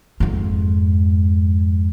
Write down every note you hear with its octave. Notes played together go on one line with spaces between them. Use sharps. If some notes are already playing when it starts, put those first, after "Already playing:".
F2 G#2